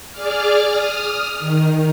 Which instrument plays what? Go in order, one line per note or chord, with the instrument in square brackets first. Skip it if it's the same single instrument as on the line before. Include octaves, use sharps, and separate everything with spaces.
[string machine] G#4 D5 D6 F6
D#6 F6
D#3